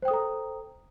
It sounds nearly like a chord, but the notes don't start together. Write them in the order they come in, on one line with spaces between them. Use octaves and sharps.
C5 G5 D#6 A4 A#5